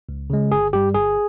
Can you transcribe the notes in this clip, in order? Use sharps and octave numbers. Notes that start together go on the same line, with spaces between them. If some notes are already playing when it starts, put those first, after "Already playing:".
C#2
C#3 G#3
G1 G#4
G2 G3 G4
G1 G#4